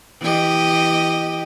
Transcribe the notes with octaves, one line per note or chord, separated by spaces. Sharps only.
E3 G4 D#5